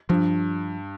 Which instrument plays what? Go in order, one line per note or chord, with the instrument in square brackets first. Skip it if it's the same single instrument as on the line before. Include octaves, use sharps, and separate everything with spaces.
[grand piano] G2 [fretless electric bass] F3